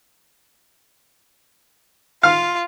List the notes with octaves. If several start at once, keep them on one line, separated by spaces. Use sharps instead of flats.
F4 F5